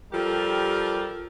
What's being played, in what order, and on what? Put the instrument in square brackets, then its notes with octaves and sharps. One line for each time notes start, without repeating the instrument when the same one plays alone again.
[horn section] F3 G3 G4 A4 A#4